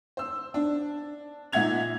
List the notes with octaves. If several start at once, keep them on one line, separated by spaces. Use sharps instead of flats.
C5 E6
D4
A#2 D#4 E5 F#5 G#6 F7